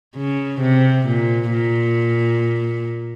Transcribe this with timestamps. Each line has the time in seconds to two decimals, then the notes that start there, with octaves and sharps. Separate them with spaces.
0.16 C#3
0.61 C3
1.07 A#2
1.52 A#2